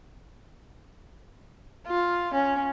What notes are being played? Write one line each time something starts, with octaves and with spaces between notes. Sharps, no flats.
F4
C#4